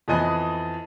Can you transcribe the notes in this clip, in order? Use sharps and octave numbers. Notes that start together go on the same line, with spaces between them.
F2 E3 B3 D#5 G#5 F#6